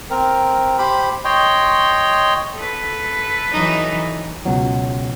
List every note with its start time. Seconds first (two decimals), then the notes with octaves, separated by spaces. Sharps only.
0.10 C4 A#4
0.79 G4 C5 B5
1.25 C#5 D#5 G5 C6
2.54 A4 B4
3.52 E3 F#3 D#4
4.45 C#2 B2 F#3